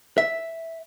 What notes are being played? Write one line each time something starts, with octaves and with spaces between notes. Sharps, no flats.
E5